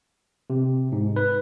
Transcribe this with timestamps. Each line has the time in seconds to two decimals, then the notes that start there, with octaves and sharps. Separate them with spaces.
0.50 C3
0.92 G#2
1.16 B4